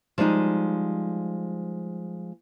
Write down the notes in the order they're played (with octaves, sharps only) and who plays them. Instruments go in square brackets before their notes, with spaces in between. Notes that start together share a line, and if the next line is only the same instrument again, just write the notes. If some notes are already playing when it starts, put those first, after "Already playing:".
[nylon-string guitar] F3 G3 G#3 D#4